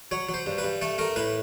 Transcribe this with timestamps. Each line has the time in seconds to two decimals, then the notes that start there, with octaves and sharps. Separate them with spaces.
0.11 F#3 C#5
0.29 F#3
0.34 C5
0.46 G2
0.58 B4
0.63 G2
0.82 A3 A4
0.98 A3 A#4
1.16 A2 B4